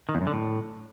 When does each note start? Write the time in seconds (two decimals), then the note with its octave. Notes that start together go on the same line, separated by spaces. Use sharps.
0.09 D#3
0.15 E2
0.21 F#2
0.27 D3
0.33 A2